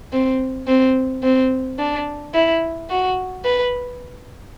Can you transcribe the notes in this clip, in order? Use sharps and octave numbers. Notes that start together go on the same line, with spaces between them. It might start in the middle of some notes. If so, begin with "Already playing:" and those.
C4
C4
C4
D4
E4
F#4
B4